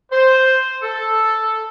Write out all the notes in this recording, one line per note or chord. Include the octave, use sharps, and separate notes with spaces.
C5
A4